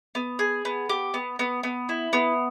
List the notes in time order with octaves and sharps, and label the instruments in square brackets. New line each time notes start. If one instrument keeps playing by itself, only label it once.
[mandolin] B3
G#4
B3
G4
B3
B3
B3
E4
B3